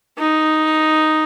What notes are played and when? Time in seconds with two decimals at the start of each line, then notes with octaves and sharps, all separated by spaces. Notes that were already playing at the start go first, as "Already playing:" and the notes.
0.18 D#4